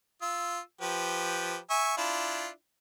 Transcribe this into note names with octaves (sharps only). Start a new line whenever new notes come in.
F4 E6
F3 G4 B4
E5 G#5 C#6
D4 E4 F4